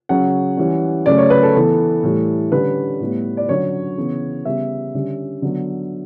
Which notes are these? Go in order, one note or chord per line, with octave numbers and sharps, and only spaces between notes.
C#3 F#3 C#4 F#5
E3 G3 C#4
C#3 F#3 A3 C#4 D5
C#5
B4
A4
E3 B3 A4
A2 E3 G3
D3 G3 C#4 B4
A2 G3 B3
D5
D3 F#3 C#4 C#5
C#3 E3 B3
C#3 G3 B3 E5
D3 G3 C#4
D3 F#3 B3